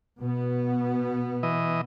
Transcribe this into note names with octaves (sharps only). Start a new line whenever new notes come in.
B2 B3
E3 D#5